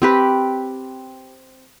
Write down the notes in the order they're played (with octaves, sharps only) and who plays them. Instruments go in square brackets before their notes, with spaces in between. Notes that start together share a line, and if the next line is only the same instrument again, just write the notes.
[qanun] C4 G4 B4